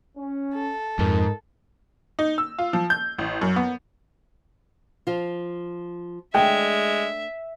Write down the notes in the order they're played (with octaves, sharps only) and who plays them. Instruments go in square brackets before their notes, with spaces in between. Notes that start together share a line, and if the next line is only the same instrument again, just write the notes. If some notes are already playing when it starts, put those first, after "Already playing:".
[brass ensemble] C#4
[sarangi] A4
[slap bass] F2 [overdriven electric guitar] G#2 [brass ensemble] D#4 A#4
[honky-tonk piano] D#4
E6
F4
F3
G6
A1
F#2
B3
[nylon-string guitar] F3 F4
[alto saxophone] G#3 [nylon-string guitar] A3 D4 [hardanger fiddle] E5 [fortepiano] G5